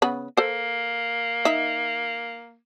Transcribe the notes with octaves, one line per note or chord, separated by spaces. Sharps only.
C#3 B3 B5
A#3 A4 C5
D#4 E5